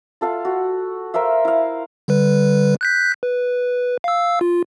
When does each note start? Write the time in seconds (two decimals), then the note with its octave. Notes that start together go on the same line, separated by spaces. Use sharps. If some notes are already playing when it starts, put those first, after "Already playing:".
0.21 F4 A4 F5 F#5
0.45 F#4
1.14 A#4 C5 E5 F5
1.45 E4 F5
2.08 D3 G3 B4
2.81 F#6 G6 B6
3.23 B4
4.04 F5 E6
4.41 F4